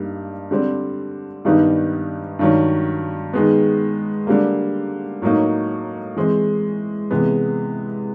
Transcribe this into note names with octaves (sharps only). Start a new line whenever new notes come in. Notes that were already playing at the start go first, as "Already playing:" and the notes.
Already playing: G2 G3 A#3 D#4
D3 G3 C4
G2 D#3 G3 B3 D#4
G2 D#3 F#3
D#3 G#3 B3
D3 G3 A#3
A2 F#3 A#3 D#4
E3 G#3 C4
C3 E3 G#3 B3